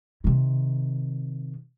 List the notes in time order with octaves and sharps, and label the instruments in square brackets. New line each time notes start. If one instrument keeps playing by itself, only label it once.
[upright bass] C3 D#3